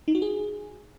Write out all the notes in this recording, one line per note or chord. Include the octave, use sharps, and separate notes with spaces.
D#4
F#4
G#4